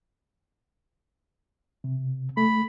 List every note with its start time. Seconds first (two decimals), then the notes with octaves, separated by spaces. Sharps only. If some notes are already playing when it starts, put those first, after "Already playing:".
1.84 C3
2.37 A3 B5